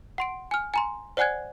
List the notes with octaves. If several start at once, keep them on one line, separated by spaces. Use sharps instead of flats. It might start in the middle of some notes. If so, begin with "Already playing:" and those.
F#5 C6 D7
G#5 F6
G#5 A#5 C6
C5 D5 F#5 G#5 F#6 G#6